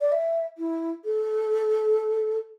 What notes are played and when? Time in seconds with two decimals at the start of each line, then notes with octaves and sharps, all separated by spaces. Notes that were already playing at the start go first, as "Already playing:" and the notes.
0.01 D5
0.11 E5
0.57 E4
1.04 A4